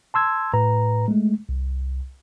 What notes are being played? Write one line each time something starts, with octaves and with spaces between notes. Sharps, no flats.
A5 C6 E6 G#6
A2 B4 A#5
G#3 A3
C2